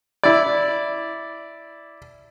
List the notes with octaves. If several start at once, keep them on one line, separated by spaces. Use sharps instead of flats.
E4 D5